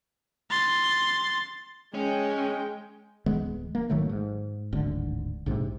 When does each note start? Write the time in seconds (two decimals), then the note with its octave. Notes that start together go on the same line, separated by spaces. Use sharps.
0.50 C6 A6
1.94 G#3 C#4 G5
3.26 D1 E3 G#3 B3
3.75 A#3
3.90 G#1 D#3 F#3 A3
4.09 G#2
4.73 D1 G#1 D3
5.46 A#1 G#2 C3